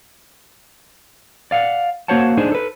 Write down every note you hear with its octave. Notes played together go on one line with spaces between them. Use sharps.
D5 F5 F#5
A#3 F#4 C5 C#5 F#5 A5
D4 D#4 G#4 C5
A4 B4